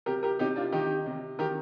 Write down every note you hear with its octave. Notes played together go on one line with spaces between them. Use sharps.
C3 G4 A#4
G4 A#4
C3 D#4 G4
D4 F4
D#3 D#4 G4
C3
D#3 G4 A#4